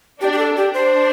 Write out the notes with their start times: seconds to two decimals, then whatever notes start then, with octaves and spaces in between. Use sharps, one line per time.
0.21 D4 G4
0.32 G4
0.38 A4
0.57 D4 G4
0.74 C5